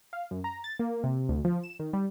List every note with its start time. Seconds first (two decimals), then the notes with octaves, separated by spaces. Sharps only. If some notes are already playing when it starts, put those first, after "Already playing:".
0.13 F5
0.31 F#2
0.44 A#5
0.64 A6
0.79 A#3
1.04 C3
1.29 D2
1.45 F3
1.63 E7
1.79 D#3
1.93 G3